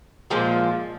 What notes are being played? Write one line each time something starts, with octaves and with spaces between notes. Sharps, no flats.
A#2 F3 G#3